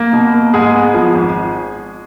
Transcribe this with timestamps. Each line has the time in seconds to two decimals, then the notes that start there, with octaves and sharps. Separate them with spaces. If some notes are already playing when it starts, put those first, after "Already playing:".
Already playing: A#3
0.13 B2
0.34 A#3
0.54 G#2 G#3 G#4
0.74 B3
0.94 F3
1.15 G#1